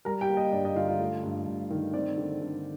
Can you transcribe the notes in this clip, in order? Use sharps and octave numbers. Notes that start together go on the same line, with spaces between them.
G3 A#4 A#5
G4 G5
A#3
D#5
G2 D5
D#5
D3 F4 F5
F4 F5
A3
G2
G2
D#3
C4 D5
D3
D3